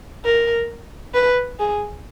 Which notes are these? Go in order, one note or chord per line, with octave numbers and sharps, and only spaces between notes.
A#4
B4
G#4